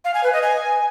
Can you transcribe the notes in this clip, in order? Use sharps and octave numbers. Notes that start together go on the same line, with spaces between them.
F5
G#5
B4
D#5
G#5